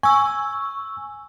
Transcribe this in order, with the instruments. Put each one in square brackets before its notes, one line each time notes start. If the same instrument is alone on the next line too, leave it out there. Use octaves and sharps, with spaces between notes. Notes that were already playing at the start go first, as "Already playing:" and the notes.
[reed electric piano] G#5 [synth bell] C#6 E6